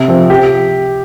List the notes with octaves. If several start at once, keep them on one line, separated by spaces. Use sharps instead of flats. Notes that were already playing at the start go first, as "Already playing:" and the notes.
Already playing: C3
F3 C4
G4